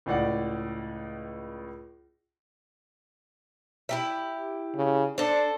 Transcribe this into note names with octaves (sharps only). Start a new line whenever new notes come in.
C#2 A2 D5 F#5
E4 G4 E5
C#3
D4 A4 C5